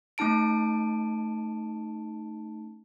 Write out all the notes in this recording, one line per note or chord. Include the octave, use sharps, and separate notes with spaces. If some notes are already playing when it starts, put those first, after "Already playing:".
A3 C#4 D#4 A5 D7